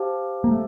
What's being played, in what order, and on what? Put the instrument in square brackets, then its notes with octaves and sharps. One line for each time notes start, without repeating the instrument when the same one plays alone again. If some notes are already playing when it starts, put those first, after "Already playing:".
Already playing: [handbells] G4 C5 F5 A5
[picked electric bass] A#3
A3